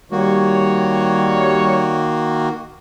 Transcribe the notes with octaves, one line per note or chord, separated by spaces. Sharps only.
D#3 G3 A#3 F#4 C#5